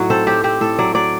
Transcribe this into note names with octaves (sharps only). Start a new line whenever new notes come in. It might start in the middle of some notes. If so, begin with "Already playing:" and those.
Already playing: A2 F#3 D#4 F#4
C4 A4
C4 G4
C4 G4
A2 A4
F#3 D5
F#3 D5